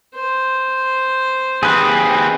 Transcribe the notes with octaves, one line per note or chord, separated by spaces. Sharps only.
C5
D#2 C4 G#4 B4